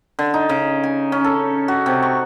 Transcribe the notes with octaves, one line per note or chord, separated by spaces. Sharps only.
D3
D#4
C#3
G#5
C#4
A4
F#4
C3
C#6